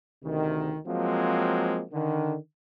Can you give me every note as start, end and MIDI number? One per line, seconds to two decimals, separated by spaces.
0.23 0.76 38
0.23 0.76 48
0.23 0.76 51
0.87 1.84 53
0.87 1.84 54
0.87 1.84 56
0.87 1.84 58
0.87 1.84 60
1.92 2.36 50
1.92 2.36 51